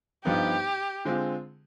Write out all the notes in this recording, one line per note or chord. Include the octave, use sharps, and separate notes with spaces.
G2 F3 B3 D#4 G4
D3 G#3 C4 F4